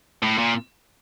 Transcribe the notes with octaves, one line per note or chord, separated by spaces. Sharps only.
A2
A#2